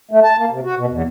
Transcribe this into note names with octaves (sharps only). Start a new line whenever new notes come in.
A3
A5
A#3
C3
F#4
B2
E2